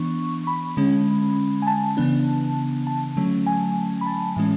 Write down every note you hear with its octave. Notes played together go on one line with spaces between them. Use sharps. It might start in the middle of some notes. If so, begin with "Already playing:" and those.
Already playing: E3 B3 D4 C#6
B5
D3 G#3 C#4
G#5
A5
C#3 E3 B3 D4
A5
D3 F#3 A3 C#4
G#5
B5
A5
A2 E3 G#3 C#4